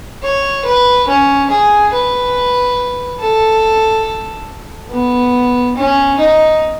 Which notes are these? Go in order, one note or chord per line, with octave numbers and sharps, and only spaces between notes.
C#5
B4
C#4
G#4
B4
A4
B3
C#4
D#4